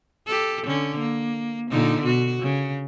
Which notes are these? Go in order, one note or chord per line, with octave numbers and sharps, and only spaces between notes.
G4 A4
D3 C#4
A#3
A#2 D3 D#4
B2 F#4
C#3